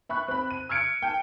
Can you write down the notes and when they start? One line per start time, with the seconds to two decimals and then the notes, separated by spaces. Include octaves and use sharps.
0.09 E5 B5 C#6 F#6
0.28 C4 B5
0.51 D#7
0.69 E6 F6 G#6 C#7 D7
1.02 G5 A5